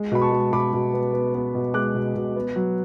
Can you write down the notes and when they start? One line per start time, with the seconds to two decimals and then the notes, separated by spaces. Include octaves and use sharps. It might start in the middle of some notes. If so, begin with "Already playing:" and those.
Already playing: G#3
0.12 B2 B5
0.21 A5 C#6
0.32 G#3
0.52 B2 B5 D6
0.73 B2
0.94 B3
1.13 B3
1.35 B3
1.55 B2
1.74 G#3 D6 F#6
1.95 B2
2.15 B2
2.36 B3
2.56 F#3